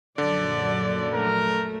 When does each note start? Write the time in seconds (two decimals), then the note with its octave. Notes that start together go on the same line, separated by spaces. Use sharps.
0.18 A#1 F#2 A#2 D3 D5
1.14 A3 A#4